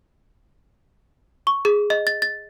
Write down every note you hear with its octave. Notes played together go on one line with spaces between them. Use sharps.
C#6
G#4
D#5
A6
A6